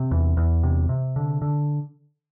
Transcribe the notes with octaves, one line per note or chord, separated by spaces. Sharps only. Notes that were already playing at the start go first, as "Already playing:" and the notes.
Already playing: C3
E2
E2
C3
C3
D3
D3